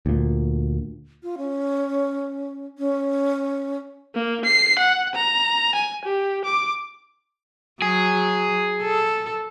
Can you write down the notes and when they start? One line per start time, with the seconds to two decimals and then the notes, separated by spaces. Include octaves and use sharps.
0.06 D2 A#2
1.23 F4
1.38 C#4
2.78 C#4
4.15 A#3
4.45 C7
4.79 F#5
5.15 A#5
5.75 G#5
6.05 G4
6.45 D6
7.82 F#3 G#4
8.82 A4